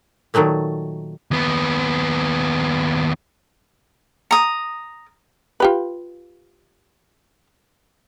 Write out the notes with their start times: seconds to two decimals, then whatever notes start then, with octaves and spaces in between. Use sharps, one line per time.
0.34 A#2 D#3 F#3 A3 A#3
1.31 D#2 B3
4.31 A#5 D#6
5.60 F4 G4 B4